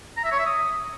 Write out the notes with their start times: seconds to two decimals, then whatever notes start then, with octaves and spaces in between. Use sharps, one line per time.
0.17 A#5
0.24 E5
0.31 C#5
0.39 E5
0.46 D#6